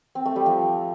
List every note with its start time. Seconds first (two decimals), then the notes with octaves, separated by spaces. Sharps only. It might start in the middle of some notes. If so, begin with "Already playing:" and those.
0.15 C4
0.26 A3
0.36 G3
0.46 F3